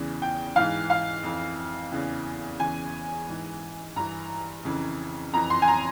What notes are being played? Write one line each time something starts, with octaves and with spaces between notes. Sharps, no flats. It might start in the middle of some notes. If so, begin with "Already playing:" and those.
Already playing: E2 C#3 E3
G5
G#2 E3 F5
F5
F2 E3
E2 C#3 E3
E2 C#3 E3 G#5
G#2 E3
G2 E3 A#5
F2 C#3 E3
F2 E3 A#5
C6
G#5
A#5